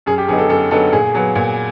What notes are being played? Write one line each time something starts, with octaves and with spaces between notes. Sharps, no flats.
F#2 G#4
G4
D3 F#3 B3 D#4 G#4
A4
F#2 A4
D3 F#3 B3 D#4 A4
A#2 G#4
F#3 B3
A#2